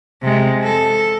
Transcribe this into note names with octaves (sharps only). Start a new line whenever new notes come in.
C3 G#3
A4